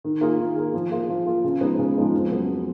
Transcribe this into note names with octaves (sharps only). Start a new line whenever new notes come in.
D#3
A#3 F4 G#4
D#3
A#3 F4 G#4
F3
A#3 F4 G#4
F3
A#3 F4 G#4
C#3
F3 G#3 B3 D#4
C#3
F3 G#3 B3 D#4
F2
C#3 F#3 B3